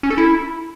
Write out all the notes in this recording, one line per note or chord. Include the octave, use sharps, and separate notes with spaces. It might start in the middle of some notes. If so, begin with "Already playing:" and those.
C#4
A4
E4